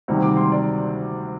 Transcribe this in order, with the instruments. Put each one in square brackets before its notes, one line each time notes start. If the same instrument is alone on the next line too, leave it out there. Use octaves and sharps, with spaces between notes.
[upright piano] D2 C3 D#3 G3
D6
C6
D5